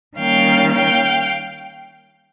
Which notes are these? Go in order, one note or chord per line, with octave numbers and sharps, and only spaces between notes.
D#3 G3 A#3 C#4 F5 G5
F5 G5